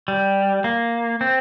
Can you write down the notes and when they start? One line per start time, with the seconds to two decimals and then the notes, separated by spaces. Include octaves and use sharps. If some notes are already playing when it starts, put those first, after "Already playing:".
0.08 G3
0.64 A#3
1.21 C4